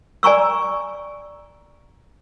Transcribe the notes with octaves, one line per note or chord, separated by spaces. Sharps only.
D5 G#5 A#5 C#6 E6